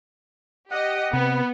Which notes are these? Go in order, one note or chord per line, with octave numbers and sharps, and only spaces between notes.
G4 D#5 F#5
C3 B3